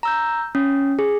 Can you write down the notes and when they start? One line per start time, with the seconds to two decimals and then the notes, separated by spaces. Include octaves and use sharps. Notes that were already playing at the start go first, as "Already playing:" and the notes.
0.03 A#5 E6 G6
0.55 C#4
0.99 G#4